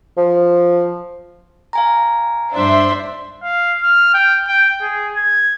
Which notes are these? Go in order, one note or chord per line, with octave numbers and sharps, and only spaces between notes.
F3
F5 G#5 A#5
G2 D4 C5 E5 C6
F5
F6
G5
G5
G#4
G#6